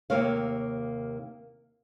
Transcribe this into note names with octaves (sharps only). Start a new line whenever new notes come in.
D#2 C3 A#3 C#5 F5